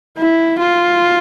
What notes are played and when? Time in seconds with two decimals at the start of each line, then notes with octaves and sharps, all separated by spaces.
0.18 E4
0.59 F4